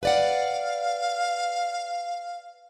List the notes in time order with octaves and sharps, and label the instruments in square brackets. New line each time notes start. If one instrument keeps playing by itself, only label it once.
[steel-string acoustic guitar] B4 D5 F#5 [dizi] F5